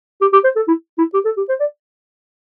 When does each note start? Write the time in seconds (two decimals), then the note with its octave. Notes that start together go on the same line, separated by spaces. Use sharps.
0.21 G4
0.33 G4
0.44 C5
0.56 A4
0.68 E4
0.98 E4
1.14 G4
1.25 A4
1.37 G4
1.49 C5
1.60 D5